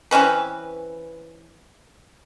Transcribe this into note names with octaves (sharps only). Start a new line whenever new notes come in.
E3 C4 C#4 B4